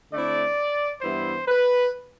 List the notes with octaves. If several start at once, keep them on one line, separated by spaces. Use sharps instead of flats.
D3 A3 C4 E4 D5
G2 E3 B3 E4 C5
B4